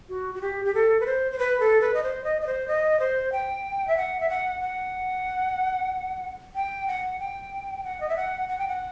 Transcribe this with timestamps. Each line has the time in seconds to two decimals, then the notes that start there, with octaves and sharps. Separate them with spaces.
0.09 F#4
0.35 F#4
0.41 G4
0.65 G4
0.74 A4
1.00 B4
1.06 C5
1.31 C5
1.39 B4
1.60 A4
1.81 B4
1.94 D#5
2.03 C5
2.24 D#5
2.41 D#5
2.47 C5
2.68 D#5
3.00 C5
3.32 G5
3.88 E5
3.97 F#5
4.21 E5
4.29 F#5
4.61 F#5
6.55 G5
6.88 F#5
7.20 G5
7.84 F#5
8.01 D#5
8.09 E5
8.17 F#5
8.49 F#5
8.58 G5
8.68 F#5